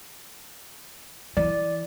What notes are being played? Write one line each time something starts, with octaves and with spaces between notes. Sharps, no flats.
E3 D5